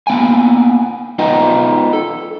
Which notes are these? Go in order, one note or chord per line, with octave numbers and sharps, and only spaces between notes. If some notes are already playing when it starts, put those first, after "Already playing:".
A#3 B3 G5 G#5
B3 D#4 F4 D#5 G5
A4